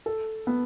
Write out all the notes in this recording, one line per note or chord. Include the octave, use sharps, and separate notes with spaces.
A4
B3